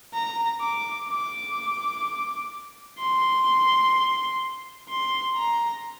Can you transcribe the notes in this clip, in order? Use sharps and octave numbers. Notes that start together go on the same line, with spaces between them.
A#5
D6
D6
C6
C6
A#5